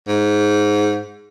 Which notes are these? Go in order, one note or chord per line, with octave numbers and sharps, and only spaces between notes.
G#2